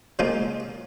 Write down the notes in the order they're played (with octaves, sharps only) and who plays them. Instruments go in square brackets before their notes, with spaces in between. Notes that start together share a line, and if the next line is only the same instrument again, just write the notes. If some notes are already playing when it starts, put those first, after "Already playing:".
[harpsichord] C#3 F3 G#3 A#3 D#4 F4